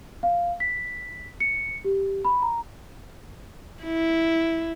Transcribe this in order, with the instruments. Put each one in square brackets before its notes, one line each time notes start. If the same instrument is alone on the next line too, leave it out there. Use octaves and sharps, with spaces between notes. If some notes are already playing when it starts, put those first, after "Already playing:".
[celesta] F5
B6
C#7
G4
B5
A#5
[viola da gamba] E4